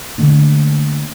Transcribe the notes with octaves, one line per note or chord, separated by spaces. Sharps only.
D3 A3 A#3 D4